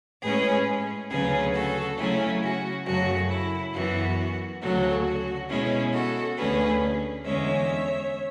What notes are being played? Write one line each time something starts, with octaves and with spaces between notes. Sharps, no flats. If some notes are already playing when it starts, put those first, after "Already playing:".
A2 G#3 C#4 G#4 B4
D2 C#3 F#3 C#4 G#4 B4
F#4 A4
C#3 F#3 A3 C#4 E4 G#4
F#4
F#2 C#3 F#3 A3 F#4
E4
F#2 E3 B3 F#4
D2 C#3 F#3 F#4 A4
F#4
B2 G#3 C#4 E4 G#4
F#4 A4
D2 D3 A3 C#4 G#4 B4
E2 D3 G#3 C#4 C#5 E5